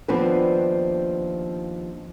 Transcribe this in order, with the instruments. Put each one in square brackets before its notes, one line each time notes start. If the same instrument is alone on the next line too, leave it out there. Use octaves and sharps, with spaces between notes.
[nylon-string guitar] D#2 F3 B3 C4 D4 B4